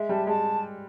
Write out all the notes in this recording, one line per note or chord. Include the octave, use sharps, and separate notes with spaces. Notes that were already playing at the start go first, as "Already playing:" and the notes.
Already playing: G#3 E5
G3 A5
G#3 A5